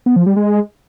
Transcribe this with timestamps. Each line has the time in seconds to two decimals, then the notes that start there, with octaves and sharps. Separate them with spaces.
0.06 B3
0.16 F3
0.26 G3
0.36 G#3